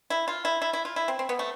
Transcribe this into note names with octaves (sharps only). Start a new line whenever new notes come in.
E4
F4
E4
E4
E4
F4
E4
C4
C4
B3
A3